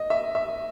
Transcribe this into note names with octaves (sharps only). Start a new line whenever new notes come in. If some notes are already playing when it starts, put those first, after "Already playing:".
Already playing: D#5
E5
E5